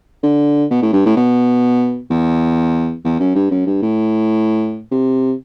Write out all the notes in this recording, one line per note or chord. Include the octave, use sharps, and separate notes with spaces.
D3
B2
A2
G2
A2
B2
E2
E2
F#2
G2
F#2
G2
A2
C3